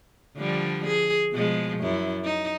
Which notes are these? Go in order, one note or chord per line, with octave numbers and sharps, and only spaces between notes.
D3 F3 G3
G#4
B2 F3 G#3
F#2 E4
D#4